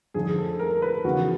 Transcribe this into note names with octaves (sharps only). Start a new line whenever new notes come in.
F2 D3 F3 G#4
A4
A#4
B4
E2 C#3 F3 F#4